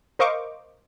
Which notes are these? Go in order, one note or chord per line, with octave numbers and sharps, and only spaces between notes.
A#4 C5 D#5 F5 C#6 D6